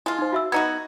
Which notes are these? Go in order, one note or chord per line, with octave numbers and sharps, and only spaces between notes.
G#3 E4 F4
D#4 C5
F#4 E5 E6
B3 D#4 F#4 G#6